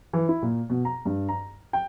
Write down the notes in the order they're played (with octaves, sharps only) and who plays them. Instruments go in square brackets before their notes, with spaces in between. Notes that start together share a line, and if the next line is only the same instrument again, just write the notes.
[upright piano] E3
E4
A#2
B2
A#5
G2
A#5
G5